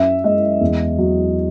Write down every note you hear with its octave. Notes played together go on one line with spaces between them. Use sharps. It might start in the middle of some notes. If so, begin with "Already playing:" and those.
Already playing: F#2 F#3 E5
G#3 D#5
E2
F#3